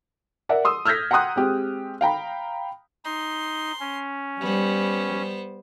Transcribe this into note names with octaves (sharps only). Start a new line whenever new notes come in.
A#4 D5 E5 F#5
C6 D#6 E6
E6 F6 G6 G#6 A#6 B6
F#5 G5 A#5 C6 D#6 F#6
G#3 C4 G4
F5 G5 A#5 B5
D#4 C6
C#4
G3 B3 C5